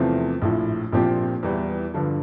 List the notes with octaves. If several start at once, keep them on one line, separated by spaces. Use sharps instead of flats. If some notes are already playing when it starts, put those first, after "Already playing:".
Already playing: E2 C3 F3 A3 C4
A#1 A2 F3
A#1 A#2 F3 C4 G4
E2 E3 G3
G2 D3 F3